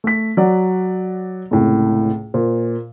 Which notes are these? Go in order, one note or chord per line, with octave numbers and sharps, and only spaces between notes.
A3 B6
F#3 D5 F#5
C#2 A2 C3
A#2 C5